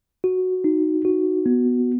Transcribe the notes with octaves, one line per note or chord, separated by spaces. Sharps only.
F#4
D#4
F#4
B3